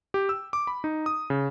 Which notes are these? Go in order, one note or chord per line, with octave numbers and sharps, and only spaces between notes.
G4
E6
D6
B5
D#4
D#6
C#3